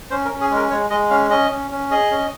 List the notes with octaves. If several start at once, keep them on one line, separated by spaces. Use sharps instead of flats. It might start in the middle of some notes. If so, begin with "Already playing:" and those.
C#4 C5
A#4
C#4
G#4
G#3 A#4
G#3 C#5
G#3 D#5
C#4 F5
C#4 D#5
C#4
C#4
G#4 D#5
C#4